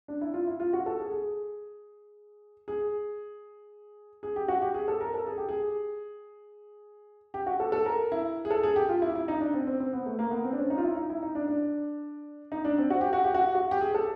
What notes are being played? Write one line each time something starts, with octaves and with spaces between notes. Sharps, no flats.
D4
E4
F4
E4
F4
F#4
A4
G#4
G#4
G#4
G#4
G4
F#4
G4
G#4
A4
A#4
A4
G#4
G4
G#4
G4
F#4
A4
A4
A#4
E4
G#4
A4
G#4
G4
F4
E4
E4
D#4
D4
C4
C4
C4
B3
A3
A#3
B3
C4
D4
C#4
D#4
F4
E4
D#4
E4
D#4
D4
D4
D#4
D4
C4
F#4
G4
F#4
G4
F#4
F#4
G4
G#4
A4